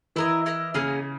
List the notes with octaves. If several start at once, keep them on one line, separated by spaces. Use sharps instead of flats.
E3 E4 A#4 D#5
E4 A#4 D#5
C#3 A#3 C#4 G#4 D#5